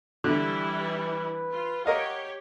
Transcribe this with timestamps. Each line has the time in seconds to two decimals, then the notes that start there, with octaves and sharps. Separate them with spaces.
0.24 D3 E3 G3 E4
0.77 B4
1.51 F4
1.86 G4 A#4 C#5 D#5 F5 F#5